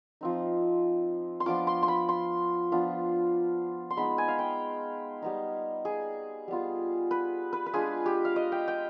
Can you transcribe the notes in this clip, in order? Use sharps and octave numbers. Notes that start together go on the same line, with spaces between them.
F3 C4 D#4
C6
F3 B3 D4 F4 D6
C6
C6
B5
C6
F3 B3 D4 F4
C6
G#3 B3 D#4 B5
G#5
F5
G5
G3 B3 D#4
G#4
G3 B3 F4
B4
B4
B4
G#3 D4 F4 G#4
G4
F5
D#5
G5
G5